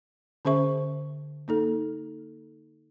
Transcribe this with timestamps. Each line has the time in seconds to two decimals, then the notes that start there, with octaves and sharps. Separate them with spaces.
0.45 D3 C#4 G#4 C5 E5 C#6
1.48 A#3 D#4 A4